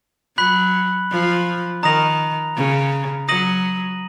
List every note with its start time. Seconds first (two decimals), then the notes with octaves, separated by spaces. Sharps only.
0.37 F#3 B5 F#6 B6 F#7
1.11 F3
1.83 D#3 A#5 D#6 A#6 F7
2.56 C#3
3.28 F#3 D#6 A#6 D#7 F#7